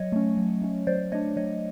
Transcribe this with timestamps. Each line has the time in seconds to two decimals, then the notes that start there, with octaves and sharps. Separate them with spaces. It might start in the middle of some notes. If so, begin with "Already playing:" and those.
Already playing: F#3 C#5 D#5
0.12 A3 C#4
0.37 F#3
0.62 A3 C#4
0.87 F#3 C5 D5
1.12 A3 D4 C#5 D#5
1.37 F#3 C#5 D#5